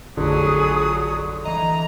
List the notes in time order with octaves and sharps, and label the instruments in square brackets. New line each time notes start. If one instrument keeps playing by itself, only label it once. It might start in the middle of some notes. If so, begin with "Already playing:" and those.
[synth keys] A1 F2 [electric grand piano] D3 [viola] F#3 [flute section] G#4 D#6
[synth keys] E3 D#5 [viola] A#5